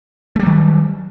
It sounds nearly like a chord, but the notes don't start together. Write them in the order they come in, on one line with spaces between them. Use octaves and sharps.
A3 G3 F#3 D#3